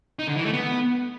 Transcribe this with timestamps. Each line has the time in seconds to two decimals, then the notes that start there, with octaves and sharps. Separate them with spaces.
0.19 D#4
0.28 D3
0.36 E3
0.45 A3
0.53 B3